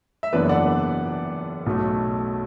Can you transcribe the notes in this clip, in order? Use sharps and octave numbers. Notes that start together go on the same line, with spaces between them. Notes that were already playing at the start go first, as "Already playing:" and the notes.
E5
F#1 F#2 E3 B3 D4 B4 D5
D5 F#5
B1 B2 A3